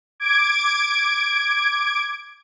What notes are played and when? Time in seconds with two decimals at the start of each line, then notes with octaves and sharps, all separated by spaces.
0.20 D6 G#6 D7